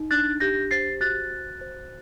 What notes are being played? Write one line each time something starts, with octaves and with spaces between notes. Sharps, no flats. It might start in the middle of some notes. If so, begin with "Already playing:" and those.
Already playing: D#4
D4 F#6 A6
G4 G6 A#6
C5 A6 C7
F#4 F#6 A6
F#4
C5